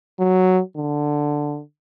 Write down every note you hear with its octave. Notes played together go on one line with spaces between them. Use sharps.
F#3
D3